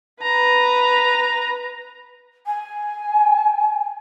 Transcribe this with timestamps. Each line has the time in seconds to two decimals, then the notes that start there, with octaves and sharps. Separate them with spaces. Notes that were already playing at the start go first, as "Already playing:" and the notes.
0.22 B4 A#5
2.46 G#5